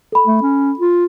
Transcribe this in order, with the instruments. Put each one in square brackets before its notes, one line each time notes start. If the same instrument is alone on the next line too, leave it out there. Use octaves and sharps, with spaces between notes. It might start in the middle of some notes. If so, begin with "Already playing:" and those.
[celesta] A4 B5
[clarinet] A3
C#4
F4